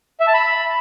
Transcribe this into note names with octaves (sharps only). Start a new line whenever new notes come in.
E5
A5
B5